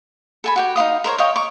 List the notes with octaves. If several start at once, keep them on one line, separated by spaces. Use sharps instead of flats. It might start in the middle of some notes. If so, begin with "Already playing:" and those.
A4 G#5 B5
F#4 G4 G5
D#4 F4 F5 D#6
A#4 C5 C#5 A#5
C#5 D#5 F5 G5
C#6 D6